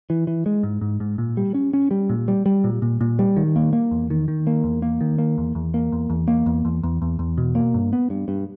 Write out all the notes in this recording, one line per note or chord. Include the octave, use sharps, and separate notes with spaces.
E3
E3
G#3
G#2
G#2
G#2
A#2
G3
C#4
C#4
G3
A#2
G3
G3
A#2
A#2
A#2
G3
D#3
A#3
A#3
E2
D#3
D#3
A#3
E2
A#3
D#3
A#3
E2
E2
A#3
E2
E2
A#3
E2
E2
E2
E2
E2
B2
A#3
G2
B3
G2
G2